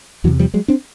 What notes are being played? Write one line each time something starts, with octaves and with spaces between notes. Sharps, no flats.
E2 C3 E3 F#3
F3 G3
F#3 G#3
C4 D4